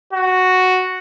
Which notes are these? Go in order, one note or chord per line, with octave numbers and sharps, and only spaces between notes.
F#4